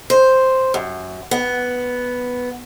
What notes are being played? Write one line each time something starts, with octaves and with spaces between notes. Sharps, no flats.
C5
F#2
B3